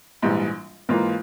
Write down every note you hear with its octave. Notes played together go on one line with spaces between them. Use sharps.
A#1 G#2 E3 G3
G#2 E3 A#3 F4